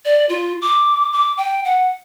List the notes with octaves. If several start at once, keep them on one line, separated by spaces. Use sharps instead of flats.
D5
F4
D6
D6
G5
F#5